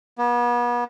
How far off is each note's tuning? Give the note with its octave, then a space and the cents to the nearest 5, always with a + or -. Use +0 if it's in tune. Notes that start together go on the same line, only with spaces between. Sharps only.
B3 -40